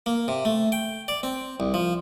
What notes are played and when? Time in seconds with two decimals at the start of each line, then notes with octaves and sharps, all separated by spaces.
0.06 A#3
0.28 C3
0.45 A3
0.72 G5
1.08 D5
1.23 C4
1.60 C2
1.74 F3